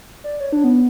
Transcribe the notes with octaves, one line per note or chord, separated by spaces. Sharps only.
D5
C#5
D4
B3